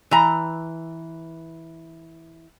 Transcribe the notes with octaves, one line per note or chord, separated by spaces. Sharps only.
E3 A#5